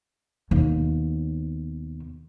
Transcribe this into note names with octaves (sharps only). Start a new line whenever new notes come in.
D#2 B2